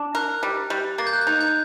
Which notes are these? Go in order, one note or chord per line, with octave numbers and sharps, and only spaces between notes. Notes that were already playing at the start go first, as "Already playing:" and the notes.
Already playing: D4
A#4 F#6
G3
G3
A#3 A6
G6
F#6
G6
D#4
G6